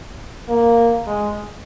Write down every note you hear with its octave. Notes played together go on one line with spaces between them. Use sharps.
A#3
G#3